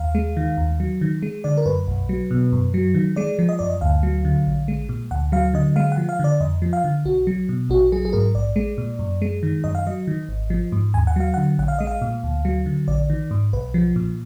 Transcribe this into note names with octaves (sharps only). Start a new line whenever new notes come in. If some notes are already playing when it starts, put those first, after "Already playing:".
Already playing: D#2 F5
G#3
D#3
D#2
F#3
D#3
G#3
D3 D5
A#4
F#2 B4
B1
F#3
B2
F#2
F#3
D#3
G#3 D5
F3
D#5
F#2 D5
D#5
D2 F5
F#3
D3
A#1
G#3
A#2
D2 F#5
F#3 F5
D3 D#5
G#3 F5
F#5
F3
F5
D3 D5
F2 D#5
F3
F5
D3
B1 F#4
F#3
B2
A#1 F#4
F#3 G#4
G#4
G#2 A#4
A#1 D5
G#3
A#2
F#2
G#3
D#3
F#2 D#5
F5
F#3 D#5
D#3
G#1
F3
G#2
D#2 G#5
F#5
F#3 F5
D3 F#5
A#1 F#5
F5
G#3 D#5
F5
A#2
D2
F#3
D3
A#1 D5
D#3
G#2
B1 B4
F3
A#2